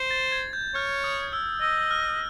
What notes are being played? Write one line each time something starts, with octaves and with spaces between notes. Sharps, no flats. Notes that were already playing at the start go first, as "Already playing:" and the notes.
Already playing: C5
A6
G#6
G6
C#5 F6
D#6
E6
D#5 E6
F6